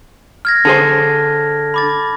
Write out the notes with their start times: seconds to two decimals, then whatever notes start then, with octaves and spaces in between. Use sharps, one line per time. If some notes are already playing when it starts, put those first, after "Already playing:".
0.45 F6 G#6 A#6
0.65 D3 G#4 C5 A5
1.74 B5 D6 A6